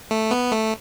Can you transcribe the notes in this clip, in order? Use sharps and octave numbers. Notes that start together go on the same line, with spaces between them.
A3
B3
A3